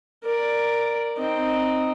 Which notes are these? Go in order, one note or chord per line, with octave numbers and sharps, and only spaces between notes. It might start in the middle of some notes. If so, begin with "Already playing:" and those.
A#4 D5
C4 D#4